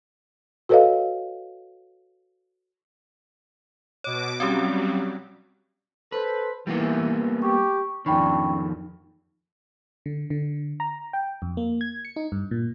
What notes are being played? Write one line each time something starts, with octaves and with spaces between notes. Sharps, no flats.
F#4 A4 B4 C#5 D#5 F5
B2 C#5 D6
F#3 G3 C4 C#4 G4
A4 B4 C5
E3 G3 A#3 B3
G4 C#6
F2 D#3 C#4 D4 G5 B5 C#6
D3
D3
A#5
G5
F2
A#3
G#6
C#7
D#4
G2
A#2